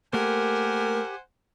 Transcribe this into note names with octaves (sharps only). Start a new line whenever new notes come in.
A3 A#3 G4 A#4 C5 F#5 G#5